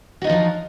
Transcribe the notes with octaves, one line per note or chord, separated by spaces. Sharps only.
F3 F#3 D#4 F4 F#4